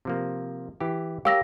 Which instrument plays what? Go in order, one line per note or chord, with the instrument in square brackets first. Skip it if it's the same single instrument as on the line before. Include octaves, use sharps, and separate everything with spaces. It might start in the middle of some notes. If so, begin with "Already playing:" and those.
[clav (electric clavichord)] C3 F3 A#3
E3 G4
[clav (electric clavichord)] G4 A#4 C#5 [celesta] F5 E6 A#6